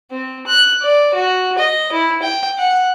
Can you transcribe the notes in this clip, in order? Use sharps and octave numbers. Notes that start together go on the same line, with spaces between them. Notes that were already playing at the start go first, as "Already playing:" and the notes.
C4
F#6
D5
F#4
D#5
E4
G5
F#5